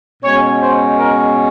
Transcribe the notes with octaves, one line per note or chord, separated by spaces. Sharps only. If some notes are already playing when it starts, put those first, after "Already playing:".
B2 G#3 C#4 C#5
C5
A#4